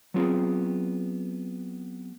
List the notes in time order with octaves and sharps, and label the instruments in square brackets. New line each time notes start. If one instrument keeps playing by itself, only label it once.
[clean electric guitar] F#3 B3 C4 F4 G#4